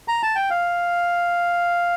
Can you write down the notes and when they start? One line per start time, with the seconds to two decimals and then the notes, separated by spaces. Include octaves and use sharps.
0.08 A#5
0.23 A5
0.36 G5
0.50 F5